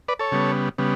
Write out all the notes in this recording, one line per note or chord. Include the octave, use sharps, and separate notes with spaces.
B4 D5
A4 C#5
C#3 G3 B3
C#3 G3 B3